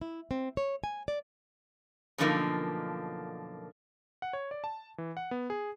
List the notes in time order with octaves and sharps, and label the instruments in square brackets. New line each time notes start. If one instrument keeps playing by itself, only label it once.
[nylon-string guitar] E4
C4
C#5
G#5
D5
[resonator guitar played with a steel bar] F#2 B2 D3 F3 A#3 D#4
[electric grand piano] F#5
C#5
D5
A5
E3
F#5
B3
G#4